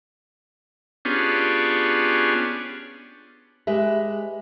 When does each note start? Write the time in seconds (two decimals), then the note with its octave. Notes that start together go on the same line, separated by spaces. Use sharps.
1.05 B3 C#4 D4 F4 G4 G#4
3.67 G#3 G4 B4 E5